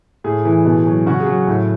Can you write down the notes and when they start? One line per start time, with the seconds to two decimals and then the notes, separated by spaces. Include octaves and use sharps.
0.24 A2 G#4
0.45 E3
0.65 B2
0.86 F#3
1.06 C#3 F#4
1.20 G#4
1.26 F#3
1.47 A2